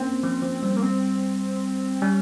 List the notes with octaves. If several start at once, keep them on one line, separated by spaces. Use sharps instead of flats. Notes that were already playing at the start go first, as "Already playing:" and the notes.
Already playing: A#3 C4 C#4
F3
F3
G3
A#3
C4
G3 C#4